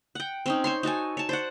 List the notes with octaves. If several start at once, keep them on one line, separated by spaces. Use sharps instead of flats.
F#5 G5
C4 C#4 D#4
C5 C#5 C6
D#4 F#4 A4 G#5
C#5 A5
C5 D5 F#5